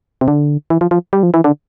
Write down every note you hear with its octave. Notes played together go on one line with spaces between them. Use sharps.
C3
D3
E3
F3
F3
G3
F3
E3
D3